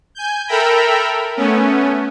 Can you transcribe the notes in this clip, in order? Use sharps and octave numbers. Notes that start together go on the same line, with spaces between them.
G#5 G6
A4 A#4 E5 G5 A#5 B5
A3 B3 C#4